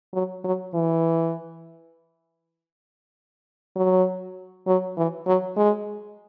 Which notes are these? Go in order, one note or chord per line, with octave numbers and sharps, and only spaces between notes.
F#3
F#3
E3
F#3
F#3
E3
F#3
G#3